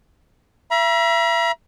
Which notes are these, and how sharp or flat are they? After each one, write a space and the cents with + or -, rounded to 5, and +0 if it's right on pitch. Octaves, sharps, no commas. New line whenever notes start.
E5 +35 A#5 +45